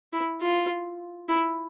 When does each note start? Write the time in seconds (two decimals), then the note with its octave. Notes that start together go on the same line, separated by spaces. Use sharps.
0.13 E4
0.41 F4
1.29 E4